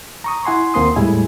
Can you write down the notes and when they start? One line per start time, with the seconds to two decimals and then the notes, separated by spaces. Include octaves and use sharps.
0.24 A#5 C#6 D#6
0.45 E4 F#5 G#5 C6
0.74 D#2 A#3 C4 C6 D#6
0.96 E2 A2 G3 G#3 E4 G#5